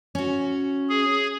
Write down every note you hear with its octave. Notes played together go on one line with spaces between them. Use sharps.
C#4 F#4
G#4